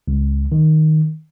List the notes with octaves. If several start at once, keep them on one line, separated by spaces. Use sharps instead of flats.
C#2
D#3